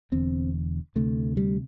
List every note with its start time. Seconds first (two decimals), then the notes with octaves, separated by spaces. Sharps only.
0.12 E1 E2 D3 C4
0.96 D2 C3 A3
1.37 G3